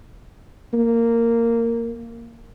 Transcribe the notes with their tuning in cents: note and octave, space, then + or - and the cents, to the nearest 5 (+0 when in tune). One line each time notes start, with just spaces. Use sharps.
A#3 -10